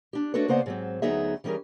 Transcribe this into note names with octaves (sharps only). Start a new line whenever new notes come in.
D4 G4
A3 D4 F#4 A4 B4 C#5
C#3 A#3 B3 C5 D5 F#5
G#2 F#3 C4
D2 F#3 B3 D#4 G#4 E5
E3 G3 C#4 G#4 A#4